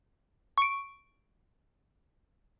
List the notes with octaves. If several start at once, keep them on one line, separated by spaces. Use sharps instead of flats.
C#6 D7